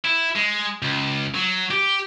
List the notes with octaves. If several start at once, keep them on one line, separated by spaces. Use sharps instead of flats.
E4
G#3
C#2
F#3
G4